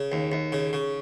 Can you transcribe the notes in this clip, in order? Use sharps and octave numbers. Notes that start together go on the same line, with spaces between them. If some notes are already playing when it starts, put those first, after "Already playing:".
Already playing: C#3
D#2
D#2
C#3
C#3